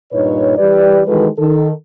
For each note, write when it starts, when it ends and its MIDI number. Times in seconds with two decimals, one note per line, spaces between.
0.12 0.55 43
0.12 0.55 46
0.12 0.55 63
0.12 0.55 71
0.12 0.55 73
0.58 1.01 52
0.58 1.01 55
0.58 1.01 67
0.58 1.01 71
0.58 1.01 74
1.07 1.27 51
1.07 1.27 52
1.07 1.27 56
1.07 1.27 66
1.07 1.27 69
1.07 1.27 71
1.38 1.70 51
1.38 1.70 69